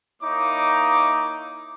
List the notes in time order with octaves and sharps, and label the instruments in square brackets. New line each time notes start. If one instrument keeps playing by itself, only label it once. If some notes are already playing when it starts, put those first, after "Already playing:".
[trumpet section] A#3 D#4 E4 C#5 D6